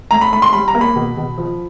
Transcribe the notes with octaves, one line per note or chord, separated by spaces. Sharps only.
A3 A#5
B5
A3 B5
C6
G3 B5
A#5
A#3
B5
B2
B2
F3